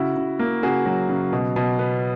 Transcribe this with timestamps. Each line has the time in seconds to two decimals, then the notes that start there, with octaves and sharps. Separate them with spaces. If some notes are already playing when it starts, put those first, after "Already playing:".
Already playing: C#3 E4 F#4
0.16 C#3
0.39 A#3
0.63 C#3 F#4 G#4
0.86 F#3
1.09 C#3
1.32 B2
1.56 B2
1.79 B3